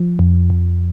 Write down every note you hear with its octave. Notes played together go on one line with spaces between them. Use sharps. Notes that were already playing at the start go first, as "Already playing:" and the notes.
Already playing: F3
F2
F2